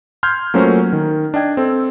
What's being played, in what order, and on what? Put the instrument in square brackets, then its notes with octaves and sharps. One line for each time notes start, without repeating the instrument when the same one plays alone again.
[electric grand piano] C6 F6 G6 G#6
F#3 A3 A#3 C#4 F4 C5
D#3
D4 D#5 G5 G#6
C4 A4